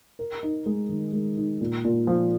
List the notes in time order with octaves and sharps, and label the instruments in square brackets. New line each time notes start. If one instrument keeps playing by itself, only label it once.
[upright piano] A#4
D#4
G#3
D#3
G#3
D#4
A#2
A#2
F3